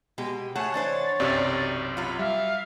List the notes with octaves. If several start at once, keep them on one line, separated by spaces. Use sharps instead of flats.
B2 G#3 G4
A3 G#4 C#5 F#5 G#5 A5
E3 D4 C5 A6
B1 F#2 C3 E3 G4 D5 A6
F#3 F4 B5
G3 E5 F5